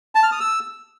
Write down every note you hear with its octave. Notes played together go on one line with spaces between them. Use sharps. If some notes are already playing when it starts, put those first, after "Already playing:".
A5
F6
D#6
E6